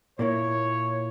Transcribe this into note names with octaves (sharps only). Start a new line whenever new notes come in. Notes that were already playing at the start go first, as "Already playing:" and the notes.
A#2 A#3 E4 C#5